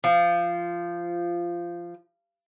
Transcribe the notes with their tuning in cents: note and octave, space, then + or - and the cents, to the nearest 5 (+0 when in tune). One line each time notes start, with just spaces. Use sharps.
F3 -15